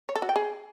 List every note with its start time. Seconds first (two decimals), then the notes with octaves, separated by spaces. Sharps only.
0.09 C#5
0.16 A4
0.22 F#4
0.29 G5
0.36 G#4